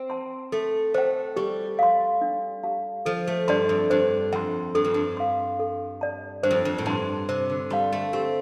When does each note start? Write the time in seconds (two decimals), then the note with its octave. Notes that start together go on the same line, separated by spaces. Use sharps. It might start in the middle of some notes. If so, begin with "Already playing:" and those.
Already playing: C4
0.10 A5 C6
0.52 A3 A4
0.94 A3 C5 G5
1.36 G3 G4
1.79 F5 C6
2.21 D4
2.63 G4 F5 A5
3.05 F3 A4
3.27 A3
3.48 G2 D5 A5 C6
3.69 F2
3.90 G2 C5
4.33 F2 G5 C6
4.75 G2 A4
4.84 F2
4.94 G2
5.17 F5 C6
5.60 A4
6.01 D5 A5
6.43 G2 C5
6.51 F2
6.65 F2
6.78 A2
6.86 G2 A5 C6
7.29 C3 C5
7.50 D3
7.70 G3 F5 A5 C6
7.92 A3
8.13 C4 G4